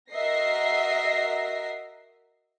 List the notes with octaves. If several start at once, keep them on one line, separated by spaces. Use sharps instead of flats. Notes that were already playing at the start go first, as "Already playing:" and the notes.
F#4 A#4 D#5 E5 A#6 C7